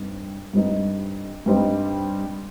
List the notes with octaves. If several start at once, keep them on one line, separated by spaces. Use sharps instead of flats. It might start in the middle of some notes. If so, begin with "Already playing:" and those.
Already playing: G2 C4 D#4
G2 G3 C4 D#4
G2 G3 C4 D#4